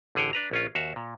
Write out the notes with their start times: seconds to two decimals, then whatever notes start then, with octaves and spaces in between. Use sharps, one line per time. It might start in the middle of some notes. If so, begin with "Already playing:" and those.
0.15 A1 D3 G#4 C#5 G5
0.33 D4 B4 A#5
0.51 A#1 C#4 F4
0.75 D#2 F#4 E5 F5
0.96 A#2